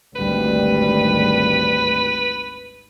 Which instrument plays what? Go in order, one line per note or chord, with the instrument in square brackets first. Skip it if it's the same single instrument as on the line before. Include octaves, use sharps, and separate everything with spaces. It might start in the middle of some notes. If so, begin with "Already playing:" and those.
[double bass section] G#1 D2 G3 [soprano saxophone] B4